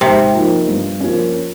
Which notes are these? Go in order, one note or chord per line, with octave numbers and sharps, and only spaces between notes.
G#2 C3
F3 A#3 D#4
G2
F3 A#3 C#4